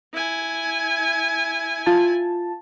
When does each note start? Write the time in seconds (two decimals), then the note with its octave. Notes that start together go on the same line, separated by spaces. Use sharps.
0.14 E4 G#5
1.86 F4 A5